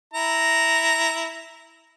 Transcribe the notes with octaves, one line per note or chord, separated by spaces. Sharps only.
E4 A#5